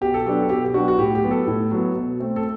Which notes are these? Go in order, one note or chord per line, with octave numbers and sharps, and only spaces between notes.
B2 G4
A4
F#3 B3 D4 G4
A4
B2 G4
G4
F#3 B3 D4 F#4
F#4
A2 G4
G4
F#3 B3
A4
A2
F#3 B3
B2
A3 C4
A4